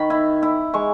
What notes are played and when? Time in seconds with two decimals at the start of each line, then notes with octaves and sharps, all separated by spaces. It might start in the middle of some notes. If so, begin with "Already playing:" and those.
Already playing: D#3 B5 C#6
0.10 E4
0.42 E4
0.74 G#3 C#6